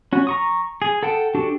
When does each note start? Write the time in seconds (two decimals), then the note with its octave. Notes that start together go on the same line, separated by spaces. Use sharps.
0.13 C#4 F#4
0.27 A#5 C#6 D#6
0.82 G#4
1.03 A4 F#5 G5 A5
1.35 D4 F#4 G4 A4